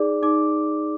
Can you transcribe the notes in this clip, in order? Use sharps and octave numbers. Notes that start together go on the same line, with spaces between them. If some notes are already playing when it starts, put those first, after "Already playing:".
Already playing: D#4 G#4 D5 D6
D#4 D6